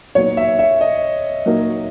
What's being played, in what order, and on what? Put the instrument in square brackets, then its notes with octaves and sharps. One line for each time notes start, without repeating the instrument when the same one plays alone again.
[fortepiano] A#2 F#3 B3 D#4 [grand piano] C#5
[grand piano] E5
E5
D#5
[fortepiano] A#2 F#3 A#3 D#4 A#4